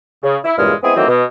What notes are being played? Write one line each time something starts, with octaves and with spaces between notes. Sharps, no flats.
C#3
E4
E2 G2 A#2 C#3 G#3 F6
G#3 B3 C4 E4 G#4
D#3 E3 F#3 A3 A#3 C4
B2